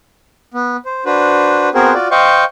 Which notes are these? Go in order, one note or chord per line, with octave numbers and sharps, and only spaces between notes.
B3
C5
D4 F#4 B4 C5
B3 C4 F#4 G#4 A#4 C5
F4 F#4 D5
C5 D#5 F5 G5 C#6